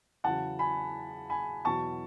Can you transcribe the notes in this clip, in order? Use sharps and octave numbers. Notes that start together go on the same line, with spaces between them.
E2 C#3 F#3 F#5 A5
G#5 B5
G#5 B5
E2 B2 F#3 A5 C#6